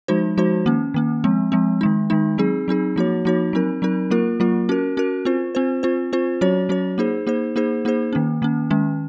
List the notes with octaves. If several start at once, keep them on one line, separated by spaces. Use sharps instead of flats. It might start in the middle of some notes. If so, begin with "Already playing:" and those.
F3 G#3 D#4 F#4 C5
F3 G#3 D#4 F#4 C5
D#3 A#3 C#4
D#3 A#3 C#4
F3 G#3 C4
F3 G#3 C4
D#3 G#3 D#4
D#3 G#3 D#4
F#3 C4 D#4 G#4
F#3 C4 D#4 G#4
F3 A#3 D#4 F#4 C#5
F3 A#3 D#4 F#4 C#5
F#3 C4 D#4 A#4
F#3 C4 D#4 A#4
F#3 A#3 F4 A#4
F#3 A#3 F4 A#4
C#4 F#4 A#4
C#4 F#4 A#4
C4 F4 C5
C4 F4 C5
C4 F4 C5
C4 F4 C5
F#3 C#4 F#4 C#5
F#3 C#4 F#4 C#5
A#3 D#4 G#4 C5
A#3 D#4 G#4 C5
A#3 D#4 G#4 C5
A#3 D#4 G#4 C5
D#3 A#3 C#4
D#3 A#3 C#4
D#3 G#3 C#4